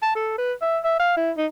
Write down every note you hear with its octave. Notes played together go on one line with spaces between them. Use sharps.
A5
A4
B4
E5
E5
F5
E4
D#4